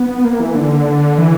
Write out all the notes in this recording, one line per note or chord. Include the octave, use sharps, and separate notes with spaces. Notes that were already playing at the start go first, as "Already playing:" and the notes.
Already playing: B3
A#3
E3
D3
E3